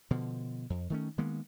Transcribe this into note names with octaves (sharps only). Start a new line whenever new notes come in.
B2 D3 F3
F2
D#3 A3 C#4
D#3 G#3 A#3 B3